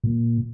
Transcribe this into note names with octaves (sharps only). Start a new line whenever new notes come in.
A#2